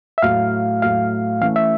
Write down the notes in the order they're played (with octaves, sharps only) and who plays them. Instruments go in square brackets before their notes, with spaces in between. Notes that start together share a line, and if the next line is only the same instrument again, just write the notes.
[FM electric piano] E5
[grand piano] A2 F#3 A3 [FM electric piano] F5
[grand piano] A2 F#3 A3 [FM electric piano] F5
[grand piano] E3 A3 C#4 [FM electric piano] F5
[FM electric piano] E5